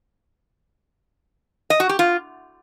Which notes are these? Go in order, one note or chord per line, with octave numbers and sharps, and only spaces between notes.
D#5
F#4
G4
F4